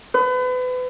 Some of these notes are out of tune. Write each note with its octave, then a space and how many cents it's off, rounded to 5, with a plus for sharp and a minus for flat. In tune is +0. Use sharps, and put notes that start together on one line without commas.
B4 +35